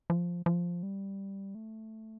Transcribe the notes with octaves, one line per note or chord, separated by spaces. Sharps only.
F3
F3
G3
A3